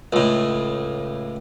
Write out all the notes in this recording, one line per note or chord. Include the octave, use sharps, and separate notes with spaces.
C#2 A2